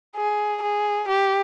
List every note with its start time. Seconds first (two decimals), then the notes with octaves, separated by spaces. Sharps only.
0.16 G#4
0.62 G#4
1.08 G4